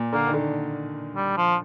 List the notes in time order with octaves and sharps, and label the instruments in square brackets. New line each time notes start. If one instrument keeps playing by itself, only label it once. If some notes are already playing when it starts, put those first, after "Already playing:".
Already playing: [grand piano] A#2
[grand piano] D3 [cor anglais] A#3
[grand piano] D#3
D3
[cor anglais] G3
F3